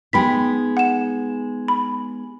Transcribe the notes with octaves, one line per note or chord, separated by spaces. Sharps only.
G#3 B3 D#4 G5 B5 B6
F#5 E7
B5